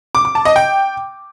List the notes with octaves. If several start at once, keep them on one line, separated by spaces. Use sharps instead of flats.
D6
D6
A5
D#5
G5